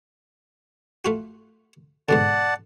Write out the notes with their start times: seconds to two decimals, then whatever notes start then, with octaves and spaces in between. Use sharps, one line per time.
1.05 A3 F4 F#4
2.09 G#2 B2 D3 D5 F#5 A5